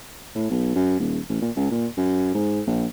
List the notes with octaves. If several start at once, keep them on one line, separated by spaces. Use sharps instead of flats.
A2
B1
F#2
D#1
A1
A#2
C#2
A#2
F#2
G#2
A#1